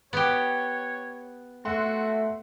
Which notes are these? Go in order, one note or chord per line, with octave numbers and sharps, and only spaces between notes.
B3 G4 C#5
A3 F#4 E5 F#5 C6